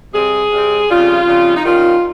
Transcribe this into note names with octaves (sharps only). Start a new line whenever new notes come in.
C3 G3 C4 G#4
C3 G3 C4
F2 C#3 G3 F4
F2 C#3 G3
D#4
D#3 G3 C#4 F4